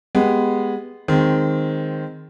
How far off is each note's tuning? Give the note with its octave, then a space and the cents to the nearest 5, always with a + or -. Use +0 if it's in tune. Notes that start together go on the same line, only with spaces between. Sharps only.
G#3 +0 B3 +0 G4 +0
D#3 +0 G#3 +0 C4 +0